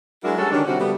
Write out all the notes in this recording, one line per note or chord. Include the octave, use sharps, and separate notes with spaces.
F#3 G#3 D4 E4 F#4 A#4
G3 G#3 C#4 F#4 A4
D3 D#3 C#4 D4
C3 G3 C4 F#4
C#3 G3 A3 B3